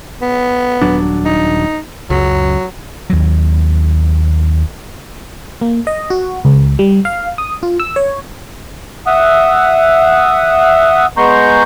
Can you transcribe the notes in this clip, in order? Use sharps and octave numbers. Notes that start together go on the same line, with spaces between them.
B3
D#1 F#3 D4
D#4
C#2 F#2 F#3
D#2 F#3
A#3
D#5
F#4
C#2
G3
F5
D#6
F4
E6
C#5
E5 F#5 D#6
G#3 B3 A#5 C6 C#6 G6